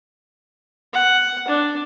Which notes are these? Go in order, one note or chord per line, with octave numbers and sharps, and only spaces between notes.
F#5
D4